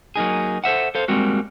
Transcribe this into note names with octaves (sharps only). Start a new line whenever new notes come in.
F#3 A#3 D#4 G#4
A4 C5 E5 F#5
A4 C5 F5
G3 G#3 A#3 C4 F#4